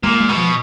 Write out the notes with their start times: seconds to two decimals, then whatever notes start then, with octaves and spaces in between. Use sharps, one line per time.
0.03 A#2 G#3
0.20 G#3
0.29 B2
0.37 F3